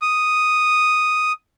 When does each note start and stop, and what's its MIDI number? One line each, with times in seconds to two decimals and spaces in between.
0.02 1.32 87